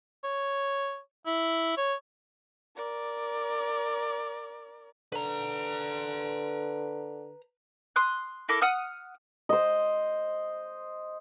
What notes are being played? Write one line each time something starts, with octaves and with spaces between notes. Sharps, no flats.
C#5
E4
C#5
A#4 D5
D3 B4 A#5
C6 D#6 F#6
E4 A4 A#4 D6
F#5 D#6 F6
C5 D#5